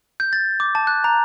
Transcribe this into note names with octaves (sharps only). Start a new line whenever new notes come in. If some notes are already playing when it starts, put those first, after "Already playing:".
G6
A6
D6
A5
F#6
A#5